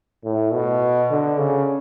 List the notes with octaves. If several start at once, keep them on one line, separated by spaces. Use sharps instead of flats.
A2
B2
D3
C#3